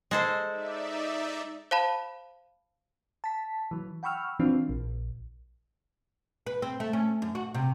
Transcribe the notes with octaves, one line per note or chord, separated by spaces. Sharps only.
G#3 A4 C5
D#4 D5 E5
C5 F5 A5 B5
A5 B6
E3 F#3
F#5 G5 B5 C#6 E6 F6
E3 F3 C4 D4 F4
A#1
B4
C4
A3
C#4
F#2
F#4
C3